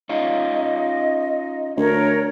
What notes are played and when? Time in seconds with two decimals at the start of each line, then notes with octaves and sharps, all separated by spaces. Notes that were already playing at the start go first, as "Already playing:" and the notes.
0.09 C#4 D#4 F4 D#5
1.77 D2 A#4 C#5